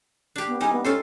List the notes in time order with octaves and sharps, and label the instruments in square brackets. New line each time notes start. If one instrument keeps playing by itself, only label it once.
[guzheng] D4 G4
[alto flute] B3
[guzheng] G3 D#4 [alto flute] G#5
[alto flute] B3
[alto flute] C#4 [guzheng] F4 A4 C5